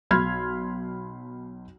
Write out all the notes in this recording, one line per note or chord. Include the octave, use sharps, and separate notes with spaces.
B1 B5 C6 F6 G#6